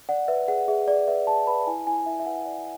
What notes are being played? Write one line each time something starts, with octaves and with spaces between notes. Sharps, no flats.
D5 F#5
B4 E5
G#4 F#5
G#4 E5
G#4 D5
B4 E5
G#4 A5
B4 B5
E4 G#5
E4 G#5
E4 E5
E5
B4 F#5
D5